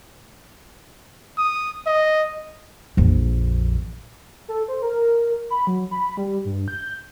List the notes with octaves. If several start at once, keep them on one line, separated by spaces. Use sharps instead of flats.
D#6
D#5
A#1 F2
A4
C5
A#4
B5
F#3
B5
G3
G2
G6